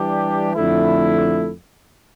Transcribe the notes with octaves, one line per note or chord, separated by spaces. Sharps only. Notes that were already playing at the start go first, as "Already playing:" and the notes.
Already playing: E3 G3 D4 G4
F2 D3 A3 E4